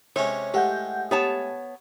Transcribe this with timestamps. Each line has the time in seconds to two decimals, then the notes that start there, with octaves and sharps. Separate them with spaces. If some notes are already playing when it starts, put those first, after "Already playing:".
0.16 C3 G#3 C#4 C#5
0.54 A2 G#3 G4 F#5 G6
1.11 B3 G4 C#5 A5